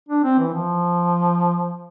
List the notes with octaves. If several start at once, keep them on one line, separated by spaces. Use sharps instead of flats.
D4
C4
E3
F3